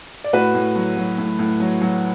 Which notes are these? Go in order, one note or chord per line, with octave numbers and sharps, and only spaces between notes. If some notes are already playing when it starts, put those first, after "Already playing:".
D5
A2 F#4 B4
A2
F#3
F#3
A2
A2
F#3
F#3